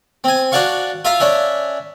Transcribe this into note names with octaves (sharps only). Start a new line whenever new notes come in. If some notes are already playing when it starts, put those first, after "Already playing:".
C4 G#5
D4 F#4 D5 F5 C#6
F4 E5 F5 A#5
C#4 D4 E5